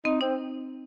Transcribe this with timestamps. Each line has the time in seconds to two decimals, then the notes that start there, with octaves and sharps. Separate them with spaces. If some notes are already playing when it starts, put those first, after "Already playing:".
0.05 C4 D#4
0.21 C4 D#4